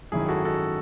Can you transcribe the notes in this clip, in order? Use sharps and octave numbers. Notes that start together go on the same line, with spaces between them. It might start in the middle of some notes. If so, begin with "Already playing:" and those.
G#1 F#2 D#3 E4 G#4
F#4 A4
F#4 A4